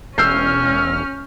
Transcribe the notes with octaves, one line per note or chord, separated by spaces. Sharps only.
E1 C#4 E6 F6 G6 C7